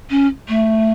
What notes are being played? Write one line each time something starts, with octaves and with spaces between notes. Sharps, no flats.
C#4
A3